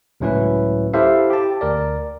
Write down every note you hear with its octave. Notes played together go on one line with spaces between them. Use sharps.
C#2 A2 F#3 C#4 E4 B4
E4 G4 A4 C5 E5 F5
G4 A5
D2 A#4 D5